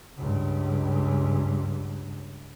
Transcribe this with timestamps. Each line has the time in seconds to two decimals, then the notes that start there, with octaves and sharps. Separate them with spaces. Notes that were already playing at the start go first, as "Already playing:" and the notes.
0.18 C#2 G2